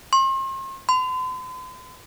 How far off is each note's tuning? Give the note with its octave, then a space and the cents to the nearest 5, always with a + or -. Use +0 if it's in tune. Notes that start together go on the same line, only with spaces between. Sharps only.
C6 +40
C6 -45